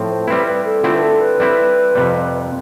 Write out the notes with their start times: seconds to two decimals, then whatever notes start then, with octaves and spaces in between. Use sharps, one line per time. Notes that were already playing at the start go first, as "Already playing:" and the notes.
Already playing: A2 F3 C4
0.09 C5
0.27 G3 C4 E4 B4
0.47 B4
0.65 A4
0.84 D3 A3 C4 E4 F4
0.95 B4
1.02 A4
1.21 B4
1.40 G3 C4 E4
1.95 F2 C3 G3